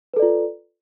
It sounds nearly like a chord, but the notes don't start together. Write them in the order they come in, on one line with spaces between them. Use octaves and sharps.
B4 A4 D5 F4